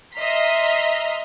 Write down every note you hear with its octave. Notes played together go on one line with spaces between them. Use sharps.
D#5 E5 A#5 C6 F6 B6